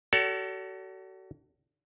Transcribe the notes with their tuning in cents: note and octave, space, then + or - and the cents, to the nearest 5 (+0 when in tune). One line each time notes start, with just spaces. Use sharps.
F#4 +35 A4 +20 D5 -45